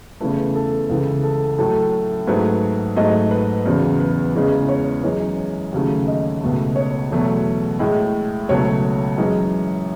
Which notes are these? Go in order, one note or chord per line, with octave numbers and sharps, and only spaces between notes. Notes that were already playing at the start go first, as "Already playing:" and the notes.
E2 C#3 E3 A3 B4
A4
C#2 C#3 E3
A4
A2 F#3 A3 A4
G#2 F#3 A3 B4
G#2 F#3 A3 D#5
B4
E2 C#3 F#3
B4
E2 C#3 E3 G#3
C#5
F#2 E3 G#3 C#5
D#2 C#3 F#3 A3
D#5
C#2 B2 A3
C#5
E2 B2 F#3 A3
A2 G#3
C#2 B2 F#3 A3 C#5
F#2 E3 G#3